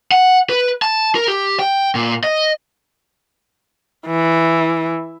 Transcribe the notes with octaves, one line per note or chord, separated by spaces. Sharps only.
F#5
B4
A5
A#4
G4
G5
A#2
D#5
E3